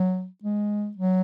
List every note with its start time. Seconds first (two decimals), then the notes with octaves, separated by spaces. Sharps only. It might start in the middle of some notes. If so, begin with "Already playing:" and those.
Already playing: F#3
0.44 G#3
0.97 F#3